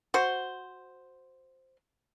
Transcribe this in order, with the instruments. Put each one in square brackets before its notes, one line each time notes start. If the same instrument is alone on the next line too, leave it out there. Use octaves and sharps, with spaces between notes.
[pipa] F#4 C5